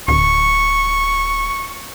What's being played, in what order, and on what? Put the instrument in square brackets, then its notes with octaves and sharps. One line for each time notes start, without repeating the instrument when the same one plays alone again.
[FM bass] D1 [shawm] C#6